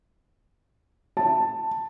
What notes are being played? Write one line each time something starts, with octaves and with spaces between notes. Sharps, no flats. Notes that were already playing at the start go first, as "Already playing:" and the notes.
A5